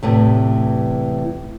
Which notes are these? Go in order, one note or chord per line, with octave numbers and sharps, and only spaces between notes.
E2 A2 C3 E3